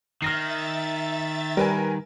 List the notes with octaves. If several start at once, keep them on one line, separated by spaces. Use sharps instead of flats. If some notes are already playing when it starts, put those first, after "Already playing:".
D#3 E5 F6 A6 A#6 C7
G3 A#4 B4 G#5